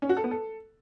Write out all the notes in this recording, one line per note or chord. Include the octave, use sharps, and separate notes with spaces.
C#4
F#4
A4
B3
A4